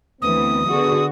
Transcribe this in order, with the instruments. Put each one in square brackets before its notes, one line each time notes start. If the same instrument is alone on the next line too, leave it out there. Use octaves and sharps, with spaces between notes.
[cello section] D2 E3 [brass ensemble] B3 C4 [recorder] D#6
[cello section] D3 F#4 [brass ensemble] B3 G#4